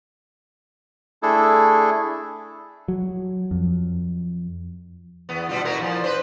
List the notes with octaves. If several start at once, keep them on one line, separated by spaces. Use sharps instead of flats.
A3 D4 E4 G#4 A4
F#3
F2
E2 B3
B2 G3 F4
B2 E4 A#4
A#2 F3
B4 C5